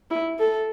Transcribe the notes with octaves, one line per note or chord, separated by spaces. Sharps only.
E4
A4